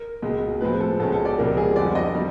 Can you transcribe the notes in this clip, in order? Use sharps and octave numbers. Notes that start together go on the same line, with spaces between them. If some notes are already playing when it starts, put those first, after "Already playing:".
Already playing: A#4
C#2 B2 G#3
A2 F3 G#3 C4 B4
A4
C#2 B2 G#3 C#4 A4
A4
D5
C#2 C3 F3 A#4
G#4
F2 D3 G3 D5
D#5
D#3 G3